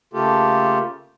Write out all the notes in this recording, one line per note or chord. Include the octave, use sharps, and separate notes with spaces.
C#3 A3 A#3 F4 G4 A4